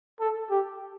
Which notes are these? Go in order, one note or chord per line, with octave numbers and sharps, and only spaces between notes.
A4
G4